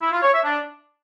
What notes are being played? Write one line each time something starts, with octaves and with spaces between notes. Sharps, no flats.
E4
F4
C#5
E5
D4